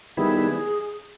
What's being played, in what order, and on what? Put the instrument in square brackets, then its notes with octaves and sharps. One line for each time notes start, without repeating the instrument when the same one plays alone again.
[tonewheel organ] D#3 G3 B3 E4 [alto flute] G#4
[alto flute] A4
G#4